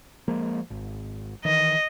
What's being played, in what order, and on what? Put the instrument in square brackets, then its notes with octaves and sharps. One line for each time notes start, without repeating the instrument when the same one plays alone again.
[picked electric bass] F3 G#3 A#3
G#1
[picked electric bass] D#3 E3 [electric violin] D#5